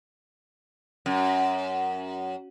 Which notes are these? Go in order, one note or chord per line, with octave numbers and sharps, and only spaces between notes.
F#2